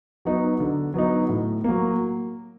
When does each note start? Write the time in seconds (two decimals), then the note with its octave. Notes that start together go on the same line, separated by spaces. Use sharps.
0.25 F#3 B3 D#4
0.60 D3
0.94 F#3 B3 D#4
1.29 A2
1.64 F#3 A#3